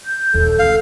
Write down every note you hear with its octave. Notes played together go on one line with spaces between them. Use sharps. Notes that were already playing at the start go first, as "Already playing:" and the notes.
G6
D#1 D#2 A4
C#2 C4 F5